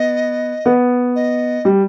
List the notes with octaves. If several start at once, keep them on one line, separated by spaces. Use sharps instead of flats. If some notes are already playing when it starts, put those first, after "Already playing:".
Already playing: B3 D#5
B3
D#5
G3